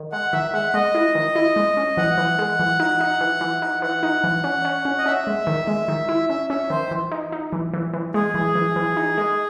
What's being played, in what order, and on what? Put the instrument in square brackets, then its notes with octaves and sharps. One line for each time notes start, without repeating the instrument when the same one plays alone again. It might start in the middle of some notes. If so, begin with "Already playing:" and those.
Already playing: [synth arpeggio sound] D#3
[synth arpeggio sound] G#3 [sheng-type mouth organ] F#5
[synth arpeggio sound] D#3 [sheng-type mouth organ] E5
[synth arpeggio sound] G#3 [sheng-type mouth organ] F#5
[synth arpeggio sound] G#3 [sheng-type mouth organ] D#5
[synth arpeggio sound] E4
D#3
E4
G#3
C#4
[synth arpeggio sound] E3 [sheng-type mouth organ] F#5
[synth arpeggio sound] E3
G#3
E3
D#4
D#4
E3
E3
D#4
[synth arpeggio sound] E3 [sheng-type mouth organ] F#5
[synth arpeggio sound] D#4
E3
C#4
C#4
C#4
[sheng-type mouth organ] D#5
[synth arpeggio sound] C#4 [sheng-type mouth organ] E5
[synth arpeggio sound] G#3
D#3
G#3
D#3
E4
[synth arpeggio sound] C#4 [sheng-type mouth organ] E5
[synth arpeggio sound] C#4 [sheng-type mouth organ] E5
[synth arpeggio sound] D#3 [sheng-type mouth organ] C5
[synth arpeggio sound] E3
D#4
D#4
E3
E3
E3
[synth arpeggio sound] G#3 [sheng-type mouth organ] G#4
[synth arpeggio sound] E3
E3
E3
D#4
G#3